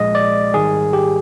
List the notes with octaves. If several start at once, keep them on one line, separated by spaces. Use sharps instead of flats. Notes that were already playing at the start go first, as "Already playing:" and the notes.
Already playing: A#1 A#2 G#3 D#5
D5
G#1 G#2 D#3 G3 G#4
G4